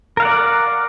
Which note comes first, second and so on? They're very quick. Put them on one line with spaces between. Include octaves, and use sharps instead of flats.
A#4 F5 F#5 D5